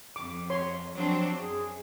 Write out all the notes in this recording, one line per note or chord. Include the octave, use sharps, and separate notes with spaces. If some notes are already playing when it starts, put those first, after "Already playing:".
F2 D6
C#5 C6
F3 F#3 C4 D4
F#2 G#4